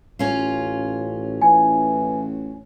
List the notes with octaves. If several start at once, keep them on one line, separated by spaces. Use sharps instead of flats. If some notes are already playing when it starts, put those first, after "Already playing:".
A1 C#4 F4
A1 E3 G#5